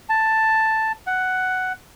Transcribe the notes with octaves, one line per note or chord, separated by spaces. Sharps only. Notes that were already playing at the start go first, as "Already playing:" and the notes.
A5
F#5